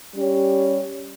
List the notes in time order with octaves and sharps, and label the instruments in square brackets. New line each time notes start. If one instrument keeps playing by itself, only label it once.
[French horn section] G3 C#4 G4 C#5